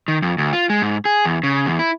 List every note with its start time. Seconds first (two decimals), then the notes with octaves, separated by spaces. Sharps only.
0.08 D#3
0.22 F2
0.38 D2
0.53 F4
0.70 G#3
0.82 G#2
1.05 G#4
1.25 E2
1.43 C#3
1.66 E2
1.79 E4